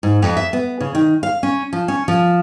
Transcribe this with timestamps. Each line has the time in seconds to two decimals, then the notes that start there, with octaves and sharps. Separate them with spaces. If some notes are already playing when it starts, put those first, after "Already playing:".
0.03 G#2
0.22 F2
0.37 E5
0.53 B3
0.80 C#3
0.95 D#3
1.23 F5
1.43 C#4
1.73 F3
1.88 C#4
2.08 F3